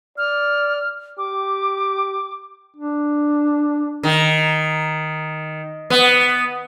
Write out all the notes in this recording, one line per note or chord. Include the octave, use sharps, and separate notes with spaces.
D5 F6
G4 D6
D4
D#3
B3